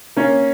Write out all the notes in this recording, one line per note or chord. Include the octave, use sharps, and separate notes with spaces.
A#3 C#4